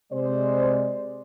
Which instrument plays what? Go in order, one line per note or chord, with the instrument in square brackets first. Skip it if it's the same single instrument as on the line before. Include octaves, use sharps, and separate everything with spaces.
[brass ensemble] C3 G#3 C5 D5